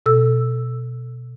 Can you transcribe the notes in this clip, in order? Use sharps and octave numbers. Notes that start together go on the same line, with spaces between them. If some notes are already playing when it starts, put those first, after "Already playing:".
B2 A4 E6